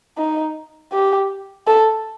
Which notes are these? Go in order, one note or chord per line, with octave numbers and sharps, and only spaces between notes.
D#4
G4
A4